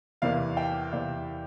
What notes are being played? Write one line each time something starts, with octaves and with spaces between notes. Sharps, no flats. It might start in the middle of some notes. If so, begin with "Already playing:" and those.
E2 C3 E3 A#3 E4 D5 F5
E5 G5
E2 C3 E3 A#3 E4 D5 F5